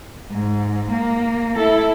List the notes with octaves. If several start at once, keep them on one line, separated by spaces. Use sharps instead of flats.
G#2
A#3
E4 A4